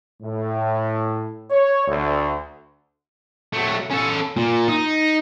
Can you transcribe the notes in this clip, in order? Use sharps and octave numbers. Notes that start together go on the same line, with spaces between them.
A2
C#5
D2
F#3 A3
C#4 A4
A#2
D#4